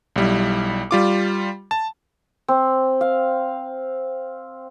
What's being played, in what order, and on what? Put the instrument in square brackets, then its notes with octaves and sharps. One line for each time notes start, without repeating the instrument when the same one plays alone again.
[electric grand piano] B1 G3 E4
G3 F4 D6
A5
[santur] C4
F5